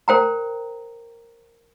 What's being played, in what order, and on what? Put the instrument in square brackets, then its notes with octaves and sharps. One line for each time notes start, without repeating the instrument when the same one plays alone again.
[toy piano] A#4 C5 G5 A#5